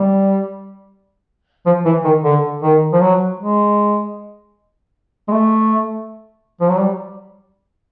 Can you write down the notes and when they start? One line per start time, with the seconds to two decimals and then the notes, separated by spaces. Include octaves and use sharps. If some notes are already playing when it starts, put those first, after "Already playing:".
Already playing: G3
1.66 F3
1.85 E3
2.04 D#3
2.24 D3
2.62 D#3
2.93 F3
3.01 F#3
3.39 G#3
5.28 G#3
5.32 A3
6.61 F3
6.70 F#3
6.78 G3